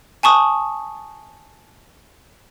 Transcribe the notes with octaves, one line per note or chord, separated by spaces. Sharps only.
G#5 A5 C#6 D#6